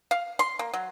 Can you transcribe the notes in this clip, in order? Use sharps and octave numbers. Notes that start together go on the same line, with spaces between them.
F5
C6
A#3
F#3